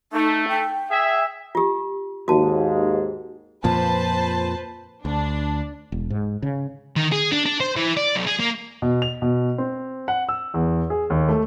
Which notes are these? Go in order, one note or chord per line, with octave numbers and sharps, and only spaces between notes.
A3 D#4
G5
G#4 E5
F4 G4
D#2 G#2 F#4 A5
F2 A#2 F3 B4 C5 A5
D2 D4
E1
G#2
C#3
D#3
G#4
D4
D4
C5
E3
D5
B1
G#4
A#3
B2
F7
B2
C4
F#5
E6
E2
G#4
D#2
A3